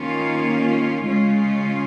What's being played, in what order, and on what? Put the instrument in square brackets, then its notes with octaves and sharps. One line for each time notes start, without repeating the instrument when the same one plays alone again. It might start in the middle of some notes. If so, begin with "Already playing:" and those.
Already playing: [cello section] D#3 A#3 C#4 F4
C#3 G#3 C#4 F4